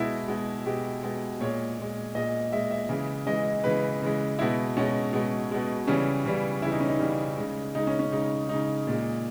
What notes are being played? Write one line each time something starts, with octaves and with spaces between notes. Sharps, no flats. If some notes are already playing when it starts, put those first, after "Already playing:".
Already playing: B2 G#3 E4
B2 G#3
B2 G#3 G4
B2 G#3
A#2 G#3 C#5
A#2 G#3
A#2 G#3 D#5
A#2 G#3 E5
E5
C#3 E3 G#3
C#3 E3 G#3 D#5
C#3 E3 G#3 B4
C#3 E3 G#3
B2 G#3 E4
B2 G#3 C#4
B2 G#3
B2 G#3
C#3 E3 G3 C#4
C#3 E3 G3
C#3 E3 G3 E4
D#4
C#4
D#4
C#3 E3 G3
C#3 G#3
C#3 G#3 D#4
C#4
C#4
C#3 G#3 D#4
C#3 G#3 D#4
A#2 G#3